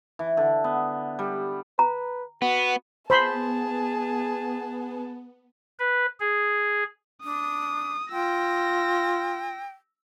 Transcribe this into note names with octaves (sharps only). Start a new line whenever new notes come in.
E3
D3
B3
G3
B4 A#5
B3 F#4
B3 G#4 C5 A5 B5 C6
B4
G#4
D4 D#6
F4 G5 E6 A#6